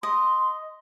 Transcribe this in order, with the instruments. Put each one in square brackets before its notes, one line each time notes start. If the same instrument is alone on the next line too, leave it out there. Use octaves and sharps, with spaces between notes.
[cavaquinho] D#5 [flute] C6